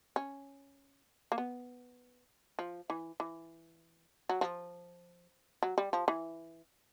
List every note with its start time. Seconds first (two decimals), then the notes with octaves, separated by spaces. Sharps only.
0.16 C#4
1.32 A#3
1.38 B3
2.59 F3
2.90 E3
3.20 E3
4.29 F#3
4.41 F3
5.63 F#3
5.78 G3
5.93 F3
6.08 E3